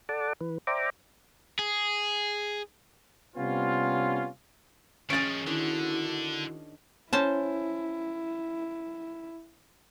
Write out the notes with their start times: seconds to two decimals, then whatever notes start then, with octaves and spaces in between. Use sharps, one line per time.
0.09 A4 D5 F#5 A5 D6
0.41 E3 B4
0.67 C5 D5 E5 G5 A#5 D6
1.59 G#4
3.36 C3 G3 B3 C#4 F4
5.10 D#3 F3 C#4 G#4 A6 D7
5.47 D3 D#3 D4 E4 F#4
7.13 C#4 E4 C5 A5